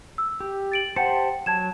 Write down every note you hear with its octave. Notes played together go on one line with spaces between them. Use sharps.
E6
G4
A6 D7 F#7
G4 C5 F#5 G5 A5 C#7
F#3 A5 G#6 E7